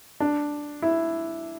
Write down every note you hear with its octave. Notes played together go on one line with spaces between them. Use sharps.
D4
E4